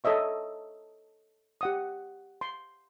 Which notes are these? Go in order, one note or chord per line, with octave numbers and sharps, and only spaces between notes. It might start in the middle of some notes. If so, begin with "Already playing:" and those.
A4 C#5 D#5 E5 C#6
G4 F#5 D#6
C6